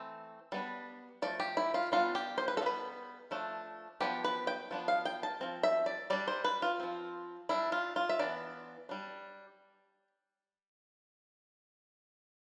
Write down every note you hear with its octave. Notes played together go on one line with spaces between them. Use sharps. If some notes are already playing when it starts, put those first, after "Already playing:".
Already playing: E3 A3 C4
G3 B3 D4
F3 A3 D5
G4
E4
F4
G3 B3 D4 F4
G4
C5
B4
A4
G3 B3 D4
B4
F3 A3 D4
F3 B3 D4 G4
B4
G5
F3 B3 D4
F5
G5
A5
F3 C4
E5
D5
G3 D4 D5
C5
B4
F4
F3 C4
G3 D4 E4
F4
F4
E5
E3 B3 D4 D5
G3 D4